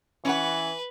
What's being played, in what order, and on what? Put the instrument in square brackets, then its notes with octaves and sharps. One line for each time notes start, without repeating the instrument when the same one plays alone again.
[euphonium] E3 [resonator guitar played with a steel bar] C#4 F#5 [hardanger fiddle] B4